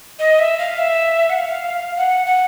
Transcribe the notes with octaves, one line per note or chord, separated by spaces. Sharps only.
D#5
E5
F5
E5
F#5
F5
F#5
F#5